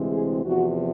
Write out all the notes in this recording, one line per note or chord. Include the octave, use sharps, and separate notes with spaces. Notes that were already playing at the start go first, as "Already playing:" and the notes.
Already playing: D2 C3 E3 G#3 C4
G#4
E2 C3 F3 F#4